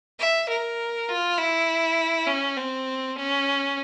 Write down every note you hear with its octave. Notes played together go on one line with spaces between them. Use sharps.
E5
A#4
F4
E4
C#4
C4
C#4